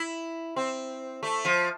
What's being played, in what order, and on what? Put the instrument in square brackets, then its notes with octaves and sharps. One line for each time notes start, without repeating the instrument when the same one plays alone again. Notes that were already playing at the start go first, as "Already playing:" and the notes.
Already playing: [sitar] E4
C4
A3
F3